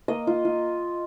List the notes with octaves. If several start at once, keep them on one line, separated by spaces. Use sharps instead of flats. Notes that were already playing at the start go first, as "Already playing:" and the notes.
A#3 D#5
F4
F4